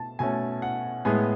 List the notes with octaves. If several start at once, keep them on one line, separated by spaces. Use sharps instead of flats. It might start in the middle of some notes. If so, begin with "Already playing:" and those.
Already playing: B2 A3 A5
B2 A3 C#4 G#5
F#5
A2 G#3 B3 G#5